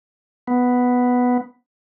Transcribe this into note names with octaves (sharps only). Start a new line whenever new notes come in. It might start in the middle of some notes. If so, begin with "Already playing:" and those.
B3